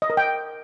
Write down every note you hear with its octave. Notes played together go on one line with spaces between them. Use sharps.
D#5
A#4
G5